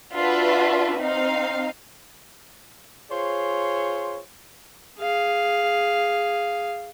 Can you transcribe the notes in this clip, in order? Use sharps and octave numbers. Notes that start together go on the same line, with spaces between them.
D4 F4 F#4 B4 D5 E5
C4 D#4 F5
F4 G#4 C5 C#5
G#4 F5